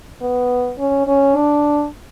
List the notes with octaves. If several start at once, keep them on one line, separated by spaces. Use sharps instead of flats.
B3
C#4
C#4
D4